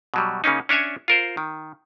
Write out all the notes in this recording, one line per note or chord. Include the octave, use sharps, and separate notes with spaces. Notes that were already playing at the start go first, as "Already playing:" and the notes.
B2 F#3 G3
C#3 A#3 C#4 D#4
C#4 D4 C#5 E5 G#5
F4 A#4 C5
D#3